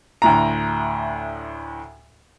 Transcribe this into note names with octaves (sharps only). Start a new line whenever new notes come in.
D2 A2 A#5